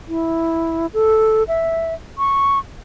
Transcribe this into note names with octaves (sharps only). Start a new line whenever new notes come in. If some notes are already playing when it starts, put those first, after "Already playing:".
E4
A4
E5
C#6